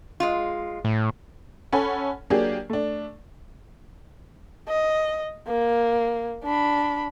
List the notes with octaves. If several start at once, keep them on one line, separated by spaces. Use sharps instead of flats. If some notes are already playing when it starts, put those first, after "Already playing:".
G#3 F4
A2
C#4 A4 F#5 G#5 B5
F#3 A#3 D4 G4 G#4
A3 D4
D#5
A#3
D4 B5